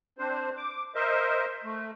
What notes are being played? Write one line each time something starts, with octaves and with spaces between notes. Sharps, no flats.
C4 D4 C5
D6
A#4 C5 D#5 E5
A3